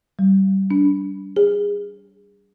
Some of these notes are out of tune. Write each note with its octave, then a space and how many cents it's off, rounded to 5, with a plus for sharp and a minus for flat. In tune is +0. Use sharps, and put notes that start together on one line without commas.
G3 -25
D4 -30
G#4 -25